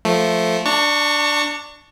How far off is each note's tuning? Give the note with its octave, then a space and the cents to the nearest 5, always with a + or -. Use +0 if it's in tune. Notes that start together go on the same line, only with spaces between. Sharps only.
F3 +0 A3 +0
D4 +0 A5 +45 C#6 +0